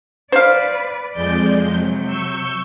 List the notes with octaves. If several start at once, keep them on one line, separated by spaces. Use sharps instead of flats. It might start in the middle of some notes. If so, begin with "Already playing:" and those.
B4 C5 D5 F5
F2 G#3 D5 G6
C3 F#3
C#6 E6 G6